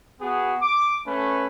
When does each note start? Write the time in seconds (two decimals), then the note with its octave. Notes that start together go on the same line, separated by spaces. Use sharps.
0.21 B3 F#4 G#4
0.62 D6
1.06 A3 C#4 B4